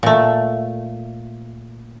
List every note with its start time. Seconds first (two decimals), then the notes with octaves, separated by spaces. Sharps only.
0.03 A#2 A3